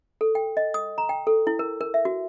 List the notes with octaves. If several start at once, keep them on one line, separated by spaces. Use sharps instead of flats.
A4
G5
D#5
D#6
A#5
G5
A4
E4
A#4
A#4
E5
F#4